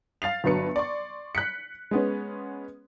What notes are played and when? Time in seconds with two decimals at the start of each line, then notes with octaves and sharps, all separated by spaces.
0.22 F5 A6 C7 F7
0.44 G1 G2 F#3 B4 C#7
0.76 D5 C6 C#6
1.35 F#6 B6 C#7
1.91 G#3 B3 C#4